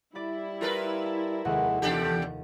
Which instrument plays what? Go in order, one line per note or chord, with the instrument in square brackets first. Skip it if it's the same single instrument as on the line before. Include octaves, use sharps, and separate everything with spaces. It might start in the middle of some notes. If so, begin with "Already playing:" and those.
[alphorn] G3 [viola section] E4 [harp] D5 B5
[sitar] F4 A#4 B4
[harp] A5
[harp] F1 D#2 F#5 [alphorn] G#3
[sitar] E2 D4 G4 [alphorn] A4